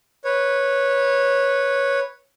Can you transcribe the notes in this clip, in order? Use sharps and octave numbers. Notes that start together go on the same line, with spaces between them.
B4 C#5